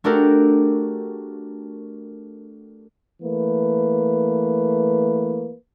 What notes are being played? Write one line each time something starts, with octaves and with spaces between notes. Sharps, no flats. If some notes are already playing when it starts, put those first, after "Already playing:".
A3 D4 F#4 G4 A4 A#4
E3 A3 A#3 B4